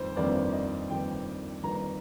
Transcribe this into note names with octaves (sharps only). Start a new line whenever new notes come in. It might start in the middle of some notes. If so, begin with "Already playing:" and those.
Already playing: G1 F2 D#3 C5
G1 F2 D#3 A#3 D4 D5
D#5
G1 F2 D#3 A#3 D4 G5
G1 F2 D#3 A#3 D4 A#5